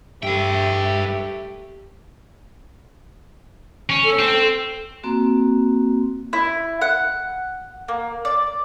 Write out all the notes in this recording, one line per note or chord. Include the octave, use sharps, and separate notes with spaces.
G2 A3 G4 B4 E5 G5
C#4
A4
C4
A#3 C4 F#4
E4
F#5
A#3
D5